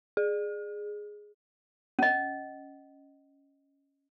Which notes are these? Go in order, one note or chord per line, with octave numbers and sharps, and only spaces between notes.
G#4
C#4 D#5